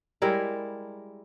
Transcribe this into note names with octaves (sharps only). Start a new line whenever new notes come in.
G3 G#3 E4 A#4